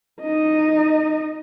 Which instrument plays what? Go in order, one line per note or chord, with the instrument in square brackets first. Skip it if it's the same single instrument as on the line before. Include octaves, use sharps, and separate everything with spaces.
[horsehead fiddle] D#4 D#5